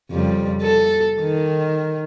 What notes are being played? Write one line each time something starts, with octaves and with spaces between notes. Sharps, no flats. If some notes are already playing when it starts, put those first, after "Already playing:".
F2 C#3 G3
A4
D#3